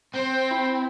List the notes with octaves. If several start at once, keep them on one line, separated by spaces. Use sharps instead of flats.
C4 C5 G5
E4